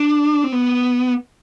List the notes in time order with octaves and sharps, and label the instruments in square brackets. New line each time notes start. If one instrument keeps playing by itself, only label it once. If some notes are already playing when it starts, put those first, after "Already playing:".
Already playing: [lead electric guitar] D4
C4
B3